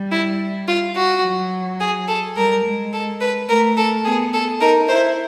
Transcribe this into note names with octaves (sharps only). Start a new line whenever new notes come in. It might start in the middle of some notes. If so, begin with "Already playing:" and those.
Already playing: G3
E4
F4
F#4
F#3
G#4
A4
G3 A#4
G#3
A4
B4
A3 A#4
A4
B3 G#4
A4
D#4 A#4
E4 C5